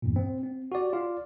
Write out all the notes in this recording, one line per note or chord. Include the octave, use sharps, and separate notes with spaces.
E2 G2 A#2
C4
C4
F#4 G4 D5
F4 D5 F5